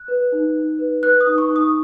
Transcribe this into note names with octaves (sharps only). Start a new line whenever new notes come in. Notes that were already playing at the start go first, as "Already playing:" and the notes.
Already playing: F#6
B4
D#4
D#4
B4
B4 F#6
D#6
D#4
C#6
D#4
D#6